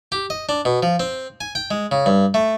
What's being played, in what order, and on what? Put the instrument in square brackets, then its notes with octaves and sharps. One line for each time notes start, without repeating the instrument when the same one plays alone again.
[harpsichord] G4
D#5
D4
B2
F3
C4
G#5
G5
G#3
C#3
G2
A3